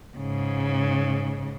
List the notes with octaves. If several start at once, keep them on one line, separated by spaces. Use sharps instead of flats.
G#2 C#3